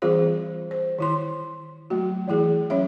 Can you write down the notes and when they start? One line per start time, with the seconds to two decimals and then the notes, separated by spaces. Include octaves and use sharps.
0.02 E3 G3 C4 F4 G#4 C5
0.71 C5
0.99 D#3 E4 C6
1.90 F#3 A3 F#4
2.28 E3 A3 E4 G#4
2.70 F#3 C#4 C#5 E5